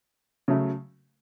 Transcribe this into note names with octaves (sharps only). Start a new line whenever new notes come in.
C#3 F#3 A3